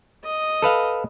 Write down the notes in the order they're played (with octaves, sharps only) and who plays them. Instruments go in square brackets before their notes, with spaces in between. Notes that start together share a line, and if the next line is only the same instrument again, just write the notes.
[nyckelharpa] D#5
[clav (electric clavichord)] A4 B4 F5